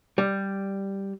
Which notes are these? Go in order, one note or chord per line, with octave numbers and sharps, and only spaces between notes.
G3